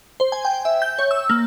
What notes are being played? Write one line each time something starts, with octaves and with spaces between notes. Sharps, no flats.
C5
G#5
G5
E5
G6
C#5
E6
A#3